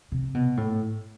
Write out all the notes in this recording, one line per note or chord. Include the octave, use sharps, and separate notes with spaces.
C3
B2
A2